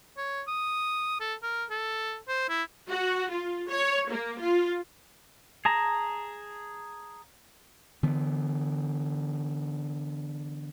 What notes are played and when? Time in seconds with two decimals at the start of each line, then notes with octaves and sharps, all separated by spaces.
0.17 C#5
0.48 D#6
1.20 A4
1.43 A#4
1.70 A4
2.28 C5
2.49 E4
2.90 F#4
3.29 F4
3.69 C#5
4.10 A#3
4.40 F4
5.65 G#4 A5 A#5
8.03 D3 E3 B3